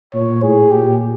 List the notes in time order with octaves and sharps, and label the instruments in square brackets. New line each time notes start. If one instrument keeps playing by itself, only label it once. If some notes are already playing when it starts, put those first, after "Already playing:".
[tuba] A#2 [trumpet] C#5
[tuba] A2 [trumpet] G#4
[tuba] A#2 [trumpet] G4